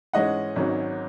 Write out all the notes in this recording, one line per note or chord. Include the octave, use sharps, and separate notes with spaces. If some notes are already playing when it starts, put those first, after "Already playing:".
G#2 E3 G#3 C#4 D#5 F#5
G#1 G#2 D#3 F#3 C#4